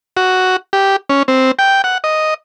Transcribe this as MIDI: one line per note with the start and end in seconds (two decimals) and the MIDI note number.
0.17 0.56 66
0.73 0.96 67
1.10 1.23 61
1.28 1.51 60
1.59 1.82 79
1.84 1.98 78
2.04 2.34 75